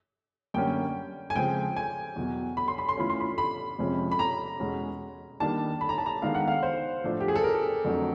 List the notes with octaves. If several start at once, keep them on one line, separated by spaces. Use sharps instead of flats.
F#2 D3 G3 A#3 C#4 G5
G#5
C#3 F3 G#3 C4 F4 G5
G#5
E2 B2 F#3
B5
C6
B5
C6
E3 A3 C#4 F4 B5
C6
B5
B5
F2 C3 F3 G#3 C#4
B5
A#5
E2 B2 G#3 C#4 F#4
D#3 G3 A#3 D4 A5
B5
A#5
A5
A#5
D#3 G#3 B3 D4 F5
F#5
F5
C5
A2 F3 A3 D4
G4
G#4
A4
A#4
F2 D3 F#3 A3 D4